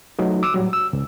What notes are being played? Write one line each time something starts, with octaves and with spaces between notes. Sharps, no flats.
F#3 A3 D#4
D6 E6
A2 F#3 G3
E6
C#2